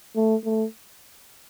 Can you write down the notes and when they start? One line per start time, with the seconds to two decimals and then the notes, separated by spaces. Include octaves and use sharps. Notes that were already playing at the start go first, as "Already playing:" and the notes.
0.16 A3
0.44 A3